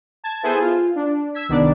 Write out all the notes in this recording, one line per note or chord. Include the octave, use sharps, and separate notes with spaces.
A5 G#6
B3 E4 G#4 A4 C5 G#5
F4
D4
E6 G#6 B6
C2 D#3 B3 D4 D5